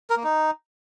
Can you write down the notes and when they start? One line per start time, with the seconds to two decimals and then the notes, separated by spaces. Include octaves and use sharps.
0.10 A#4
0.17 A#3
0.24 D#4